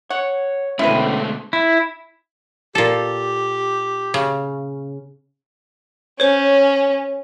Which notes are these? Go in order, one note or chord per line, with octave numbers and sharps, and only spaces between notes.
C#5 F#5
B2 D3 G#3 A3 C#4 E4 B4 C5
E4
A#2 G4 A4
C#3
C#4 C5 C#5